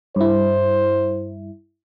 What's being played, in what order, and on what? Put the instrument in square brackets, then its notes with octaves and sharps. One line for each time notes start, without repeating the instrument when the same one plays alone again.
[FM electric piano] G2 E4 [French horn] C5